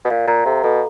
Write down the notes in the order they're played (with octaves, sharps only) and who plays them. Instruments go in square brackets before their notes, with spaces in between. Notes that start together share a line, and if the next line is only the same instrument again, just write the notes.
[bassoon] B2
[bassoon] A#2 [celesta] F5
[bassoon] A#2 [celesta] A#5
[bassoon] C3 [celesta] A4
[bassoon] B2 [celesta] A4